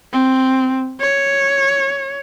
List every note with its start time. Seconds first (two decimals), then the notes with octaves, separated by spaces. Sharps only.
0.13 C4
1.01 C#5